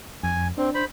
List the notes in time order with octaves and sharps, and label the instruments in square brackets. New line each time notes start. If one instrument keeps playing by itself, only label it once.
[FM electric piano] F2 [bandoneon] G#5
[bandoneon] C4 [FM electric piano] D4
[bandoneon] C5 B5